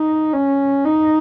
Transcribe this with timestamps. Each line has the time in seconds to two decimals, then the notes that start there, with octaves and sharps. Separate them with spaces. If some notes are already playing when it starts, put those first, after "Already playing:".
Already playing: D#4
0.33 C#4
0.85 D#4